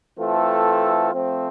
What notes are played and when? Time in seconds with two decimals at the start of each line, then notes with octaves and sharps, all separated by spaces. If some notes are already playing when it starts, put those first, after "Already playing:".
0.18 E3 A3 C4 F4 A4
1.12 F3 A3 C4